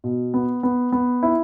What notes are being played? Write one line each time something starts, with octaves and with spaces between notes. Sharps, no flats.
B2
B3
B3
B3
E4